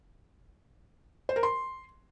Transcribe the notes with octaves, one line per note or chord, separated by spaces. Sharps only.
C5
A#4
C6